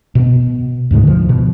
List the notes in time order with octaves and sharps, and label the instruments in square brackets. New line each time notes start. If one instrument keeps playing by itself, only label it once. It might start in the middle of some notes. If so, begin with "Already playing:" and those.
[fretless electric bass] B2 B3
D2 G#2 C#3 G#3
D3 F3
B2